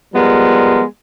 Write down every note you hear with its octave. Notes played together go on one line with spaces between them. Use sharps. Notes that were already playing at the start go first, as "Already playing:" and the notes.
F3 G3 G#3 B3 A#4